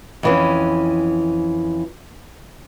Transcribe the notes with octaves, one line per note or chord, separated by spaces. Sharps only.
F2 E3 C#4